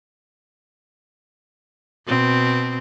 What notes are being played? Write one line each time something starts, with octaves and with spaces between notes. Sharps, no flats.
B2 C4